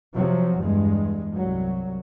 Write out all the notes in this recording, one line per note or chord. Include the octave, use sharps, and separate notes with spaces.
C3 F3 F#3
E2 G2 G#3
C2 F#3